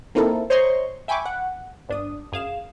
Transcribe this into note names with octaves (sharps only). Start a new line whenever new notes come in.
A#3 C4 D#4 E4 A4 A#4
C5 C#5 D#5 A#5 C6 C#6
E5 G5 G#5 B5 C#6 D6
F#5
G1 D4 D#6
F#2 G#4 F5 E7